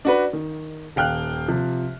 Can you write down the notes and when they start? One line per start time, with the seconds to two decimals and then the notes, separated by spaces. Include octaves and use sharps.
0.05 D4 F#4 B4
0.33 D#3
0.96 D#1 F5 G5 F6 F#6
1.48 C3 F3